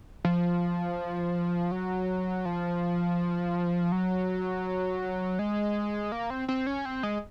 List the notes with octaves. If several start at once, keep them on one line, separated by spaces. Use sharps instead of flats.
F3
F#3
F3
F#3
G#3
A#3
C4
C4
C#4
C4
G#3